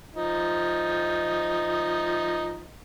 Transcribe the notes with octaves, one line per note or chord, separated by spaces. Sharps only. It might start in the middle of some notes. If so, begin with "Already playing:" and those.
F3 D#4